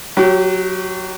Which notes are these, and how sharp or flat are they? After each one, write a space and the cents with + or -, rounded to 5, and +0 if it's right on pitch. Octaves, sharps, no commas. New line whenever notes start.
F#3 +0 G4 -30